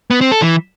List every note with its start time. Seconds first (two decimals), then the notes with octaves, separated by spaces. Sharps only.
0.11 B3
0.21 C4
0.31 A4
0.42 E3